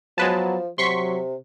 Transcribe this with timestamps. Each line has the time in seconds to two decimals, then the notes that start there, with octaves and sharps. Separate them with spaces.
0.18 F3 F#3 G#3 B3 B4 A5
0.78 C3 F#3 C6 C#6 B6